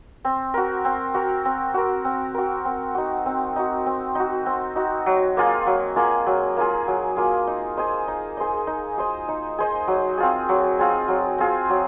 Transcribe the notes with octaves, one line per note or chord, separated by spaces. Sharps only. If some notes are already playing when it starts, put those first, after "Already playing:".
C4
F#4 A#4
C4
F#4 A#4
C4
F#4 A#4
C4
F#4 A#4
C4
D#4 F#4
C4
D#4 F#4
C4
D#4 F#4
C4
D#4 F#4
F#3
A#3 F4 G#4
F#3
A#3 F4 G#4
F#3
A#3 F4 G#4
F#3
A#3 F4 G#4
D#4
G#4 C5 D#5
D#4
G#4 C5 D#5
D#4
G#4 C5 D#5
D#4
G#4 C5 D#5
F#3
C4 F4 G#4
F#3
C4 F4 G#4
F#3
C4 F4 G#4
F#3